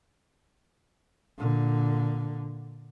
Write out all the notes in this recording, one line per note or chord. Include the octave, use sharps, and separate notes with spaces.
A#2 D3